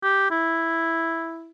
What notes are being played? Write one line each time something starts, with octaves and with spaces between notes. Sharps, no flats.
G4
E4